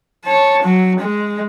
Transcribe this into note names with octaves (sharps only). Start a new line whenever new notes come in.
C#5 A5
F#3
G#3